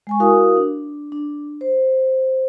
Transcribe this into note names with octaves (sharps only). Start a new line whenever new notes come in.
G#3 G#5 C#6
E4 F#4 A#4 F5 D#6
D4
D4
C5